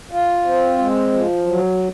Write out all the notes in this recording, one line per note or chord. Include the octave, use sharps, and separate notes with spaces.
F4
C4
G#3
F3
F#3